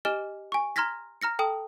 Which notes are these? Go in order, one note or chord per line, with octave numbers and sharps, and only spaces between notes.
G4 D#5 G#5 F6 E7 G7
G#5 C#6
A#5 C6 F6 G#6 A#6 B6
A#5 F6 A#6 C#7
A4 G5 A5 D#6